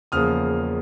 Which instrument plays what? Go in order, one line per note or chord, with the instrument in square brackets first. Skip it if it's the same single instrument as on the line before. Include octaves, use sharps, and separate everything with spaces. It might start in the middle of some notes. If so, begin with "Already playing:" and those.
[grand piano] E2 C#3 F3 A#3 D#6 F6